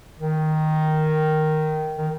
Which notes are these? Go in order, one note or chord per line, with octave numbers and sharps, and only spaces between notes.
D#3
D#3